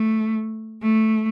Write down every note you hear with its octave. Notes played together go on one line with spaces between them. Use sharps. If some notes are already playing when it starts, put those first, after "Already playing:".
Already playing: A3
A3